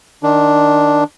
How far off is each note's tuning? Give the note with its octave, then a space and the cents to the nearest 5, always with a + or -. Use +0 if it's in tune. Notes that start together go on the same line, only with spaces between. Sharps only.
D#3 -15 D4 +0